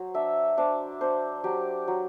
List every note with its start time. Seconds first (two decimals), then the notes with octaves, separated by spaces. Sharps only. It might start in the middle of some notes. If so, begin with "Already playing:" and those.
Already playing: F#3 C5
0.14 D4 E5
0.58 D4 C5
1.01 D4 C5
1.44 F#3 G4
1.88 F#3